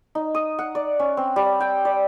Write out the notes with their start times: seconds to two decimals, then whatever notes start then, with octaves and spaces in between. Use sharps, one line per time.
0.15 D#4
0.35 D#6
0.59 F#5
0.75 D5
0.99 C#4
1.17 C4
1.36 G3
1.60 G5
1.85 D5